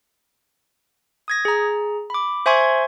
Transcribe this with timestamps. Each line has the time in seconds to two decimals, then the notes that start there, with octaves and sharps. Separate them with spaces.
1.28 D#6 G#6 A#6
1.45 G#4 A#5
2.10 B5 D6
2.46 C5 E5 G#5 C6 C#6 G#6